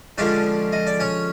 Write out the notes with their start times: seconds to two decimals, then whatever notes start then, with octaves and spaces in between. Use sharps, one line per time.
0.18 D3 F3 G#3 C#4 D4 D5
0.73 D#5
0.87 D5
1.00 C#4 C#5